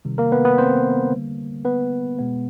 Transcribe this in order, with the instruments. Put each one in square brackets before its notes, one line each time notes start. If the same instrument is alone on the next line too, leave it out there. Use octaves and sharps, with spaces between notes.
[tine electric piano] C3 D#3 G3
A#3 A#4
B3 B4
B3 B4
C4 C5
D3 G3 A#3
B3 B4
B2 G#3 B3